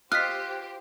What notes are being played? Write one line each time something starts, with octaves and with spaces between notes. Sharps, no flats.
F4 G4 C5 D#5 F6 F#6 B6